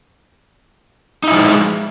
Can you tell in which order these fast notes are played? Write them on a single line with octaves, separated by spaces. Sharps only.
D#4 E4 F3 G#3